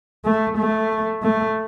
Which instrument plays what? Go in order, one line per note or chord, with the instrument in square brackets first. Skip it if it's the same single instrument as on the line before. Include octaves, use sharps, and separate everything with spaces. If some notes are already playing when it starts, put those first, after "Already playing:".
[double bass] A3
A3
A3